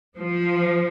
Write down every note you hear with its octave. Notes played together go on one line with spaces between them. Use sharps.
F3